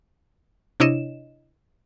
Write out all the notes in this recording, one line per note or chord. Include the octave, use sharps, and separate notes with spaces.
C3 D4 E4 C#5 D#5 E7